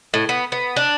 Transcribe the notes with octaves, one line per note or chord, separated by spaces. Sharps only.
A2
B3
B3
D4